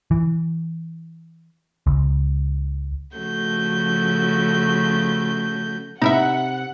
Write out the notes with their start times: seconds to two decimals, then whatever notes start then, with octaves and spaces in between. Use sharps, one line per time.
0.11 E3
1.87 C#2
3.17 C#3 F3 A3 F#4 G6
6.02 C3 D#4 E4 E5 F#5